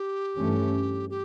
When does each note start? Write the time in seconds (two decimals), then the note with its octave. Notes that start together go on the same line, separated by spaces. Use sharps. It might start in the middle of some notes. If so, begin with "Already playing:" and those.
Already playing: G4
0.38 G2 E3 A3 C#4
1.10 G4